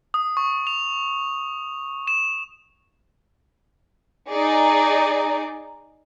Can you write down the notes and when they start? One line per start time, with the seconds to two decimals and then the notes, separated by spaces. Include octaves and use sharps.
0.14 D#6
0.37 C#6
0.67 F7
2.08 E7
4.30 D#4 G#4 D5